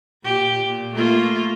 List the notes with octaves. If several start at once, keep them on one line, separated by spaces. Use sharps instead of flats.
A#2 G4
A#2
A3 A#3 F4